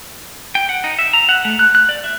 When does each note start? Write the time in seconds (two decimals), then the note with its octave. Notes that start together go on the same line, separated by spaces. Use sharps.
0.55 G5
0.69 F#5
0.84 D#4
0.99 E5
1.13 A#5
1.29 F#5
1.45 A3
1.59 F#6
1.75 F#6
1.89 D5
2.04 E5